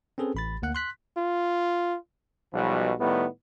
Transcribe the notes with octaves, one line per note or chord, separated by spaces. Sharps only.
C4 C#4 G#4 A4 B4
A1 B5 A6
D2 A#3 F#5 F#6
C6 F#6 B6
F4
B1 B2 F3 G3
A2 D#3 G3 B3